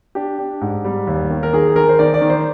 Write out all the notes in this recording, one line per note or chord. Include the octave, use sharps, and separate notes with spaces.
D4 G4
D4
G#2
G3
D#2
D#3
A#4
D#3 G#4
D#3 A#4
C5
D#3 D5
D5
D#3
C5